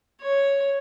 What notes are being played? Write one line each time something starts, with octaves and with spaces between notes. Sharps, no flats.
C#5